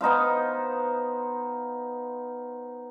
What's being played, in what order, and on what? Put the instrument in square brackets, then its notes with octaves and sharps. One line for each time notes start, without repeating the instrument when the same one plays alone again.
[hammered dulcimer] B3 D#4 C5 F5